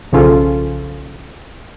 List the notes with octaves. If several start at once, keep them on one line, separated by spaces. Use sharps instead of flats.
B1 C#3 F3 C#4 F4 A4